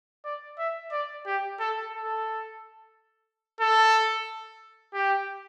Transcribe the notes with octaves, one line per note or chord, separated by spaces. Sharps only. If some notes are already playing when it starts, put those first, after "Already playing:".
D5
E5
D5
G4
A4
A4
A4
G4